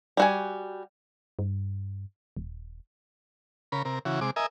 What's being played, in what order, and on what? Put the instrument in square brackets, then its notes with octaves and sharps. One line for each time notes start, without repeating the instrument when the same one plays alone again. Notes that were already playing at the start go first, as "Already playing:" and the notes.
[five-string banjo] G3 F#4 G#5
[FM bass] G2
D#1
[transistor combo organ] C#3 A#4 B5
C3 A#4
C#3 E3 F#4
C3 G#3 D6
A#4 D#5 E5 G#5